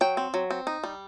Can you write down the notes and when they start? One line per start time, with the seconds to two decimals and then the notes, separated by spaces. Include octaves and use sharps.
0.01 F#3 G5
0.17 C4
0.34 F#3
0.51 C4
0.67 D#4
0.84 G3